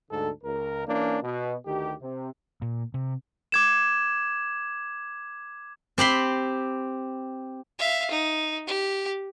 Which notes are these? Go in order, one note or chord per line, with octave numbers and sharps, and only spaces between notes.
D2 G#2 D3 A4
C#2 A#4
E3 A#3 C#4 D4
B2
D2 D#3 G4
C3
A#2
C3
D6 G#6 E7
C4 G4 B5 C6
E5 F5
D#4
G4